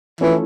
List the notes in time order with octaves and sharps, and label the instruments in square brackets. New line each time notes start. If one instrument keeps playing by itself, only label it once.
[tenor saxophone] E3 [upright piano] F3 A3 C#4 E4 A4